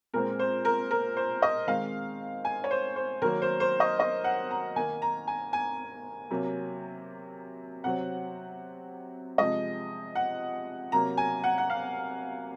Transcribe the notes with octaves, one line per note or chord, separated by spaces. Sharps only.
A#2 G#3 C4 A#4
C5
A#4
A#4
C5
D#5
D#3 G#3 C4 F5
G#5
C#5
C5
C5
D#3 F#3 A#3 A#4
C5
C5
D#5
D#5
F#5
A#5
D#3 A#3 G#5
A#5
G#5
G#5
C3 F#3 A#3
C3 F#3 C4 F#5
C3 F3 G#3 D#5
F#5
C3 F#3 A#3 A#5
G#5
F#5
F#5
F5